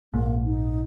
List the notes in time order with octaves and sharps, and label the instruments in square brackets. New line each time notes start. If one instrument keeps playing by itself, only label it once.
[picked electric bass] A#1 G#2 [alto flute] A#3
[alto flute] D#4